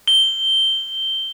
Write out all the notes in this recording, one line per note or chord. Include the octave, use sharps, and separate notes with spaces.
G7